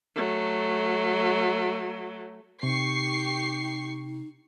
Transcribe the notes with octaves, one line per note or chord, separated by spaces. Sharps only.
F#3 A3
C3 D#4 G4 C#6 C7